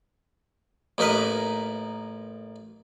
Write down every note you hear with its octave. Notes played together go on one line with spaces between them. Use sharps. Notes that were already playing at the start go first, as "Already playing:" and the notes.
A1 A#3 D#4 A#4 B4